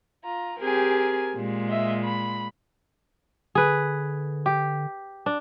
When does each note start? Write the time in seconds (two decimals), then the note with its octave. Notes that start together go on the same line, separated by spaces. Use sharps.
0.25 F4 A#5
0.59 C4 G4 G#4 A#4 G#5
1.35 A#2 G#3
1.69 D#5 E5
2.05 B5
3.55 D3 G#4 B4
4.46 G4
5.26 D4